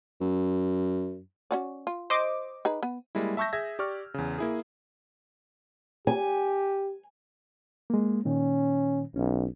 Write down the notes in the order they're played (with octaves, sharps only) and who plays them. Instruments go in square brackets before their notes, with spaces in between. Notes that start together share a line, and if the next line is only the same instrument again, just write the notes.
[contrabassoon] F#2
[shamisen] C#4 F#4 D5
F4
[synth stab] C5 D#5 D6
[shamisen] D#4 G#4 B4
B3
[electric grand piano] G3 G#3 A#3 E4
E5 A5 C#6 E6 G6 A#6
G#4 E5 G#6 A#6
G4 D5 C#6 F6
E2 C#3
A#3 E4 G#4
[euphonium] G4 [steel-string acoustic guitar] G#5
[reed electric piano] G#3 A#3
[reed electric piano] A#2 D#3 [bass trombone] C#4
[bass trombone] B1 [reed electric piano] C#4